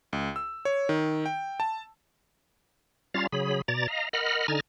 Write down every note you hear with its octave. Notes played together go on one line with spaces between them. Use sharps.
C#2
E6
C#5
D#3
G5
A5
G3 C#4 F4 F5 A#5 A6
C#3 F#3 G#4 B5
B2 D5 A#5 A6
D#5 F5 A#5
A#4 D#5 F#5 B5 F6
D3 D#4 G#5 A#5 F6 A6